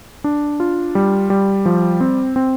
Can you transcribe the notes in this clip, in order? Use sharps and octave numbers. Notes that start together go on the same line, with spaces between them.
D4
F4
G3
G3
F3
C4
C4